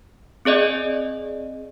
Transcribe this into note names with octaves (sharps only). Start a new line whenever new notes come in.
C4 G#4 D5 D#5